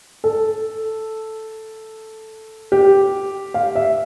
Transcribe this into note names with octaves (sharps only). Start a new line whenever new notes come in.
A4
G4
F5
E5